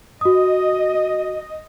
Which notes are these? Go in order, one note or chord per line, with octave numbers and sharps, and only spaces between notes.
F#4 D#5 D#6